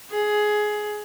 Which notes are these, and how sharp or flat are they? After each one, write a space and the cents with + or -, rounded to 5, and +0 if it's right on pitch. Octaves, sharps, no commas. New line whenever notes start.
G#4 +15